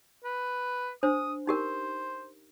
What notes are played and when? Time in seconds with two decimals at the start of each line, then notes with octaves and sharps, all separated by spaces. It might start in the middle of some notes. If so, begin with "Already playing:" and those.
0.24 B4
1.03 D4 C5 D#6
1.47 D#4 G4 A#4 C5